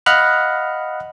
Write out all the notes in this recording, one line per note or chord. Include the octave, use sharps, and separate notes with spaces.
D#5 F5 F#5 B5 F6 F#6